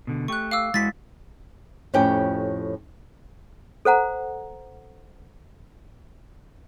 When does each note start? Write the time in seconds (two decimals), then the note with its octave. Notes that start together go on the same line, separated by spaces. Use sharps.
0.07 B2 D3
0.28 A3 G4 C#6 F#6
0.51 F5 D6 E6
0.74 G#3 E4 F#4 A6 B6
1.94 F2 A2 C#4 G4 C#5 G5
3.85 A4 C5 F#5 A#5